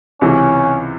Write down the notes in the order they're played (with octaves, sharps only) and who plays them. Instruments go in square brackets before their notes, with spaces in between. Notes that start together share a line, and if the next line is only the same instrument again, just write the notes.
[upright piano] C#2 C3 E3 [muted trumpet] C#4